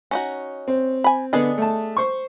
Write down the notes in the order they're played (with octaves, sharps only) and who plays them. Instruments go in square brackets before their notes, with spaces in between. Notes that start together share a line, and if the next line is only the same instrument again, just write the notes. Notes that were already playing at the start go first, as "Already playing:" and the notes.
[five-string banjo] C#4 D#4 F#4
[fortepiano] C4
[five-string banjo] G#5 B5
[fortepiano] D3 B3 [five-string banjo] D4 G#4 D#5
[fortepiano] A3 A5
C5 C#6